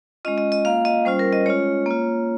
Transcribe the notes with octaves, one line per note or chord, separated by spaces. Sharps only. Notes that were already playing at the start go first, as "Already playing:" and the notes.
G#3 C#4 F4 D#5
D#5
D#5
A#3 F4 F5
D#5
G3 C#4 F4 C5
A#4
D#5
G#3 C#4 F4 C#5
A#3 F4